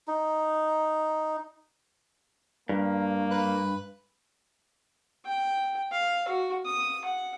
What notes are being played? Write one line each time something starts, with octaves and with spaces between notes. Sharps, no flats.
D#4
G2 A#3
B4
G5
F5
F#4
D#6
F#5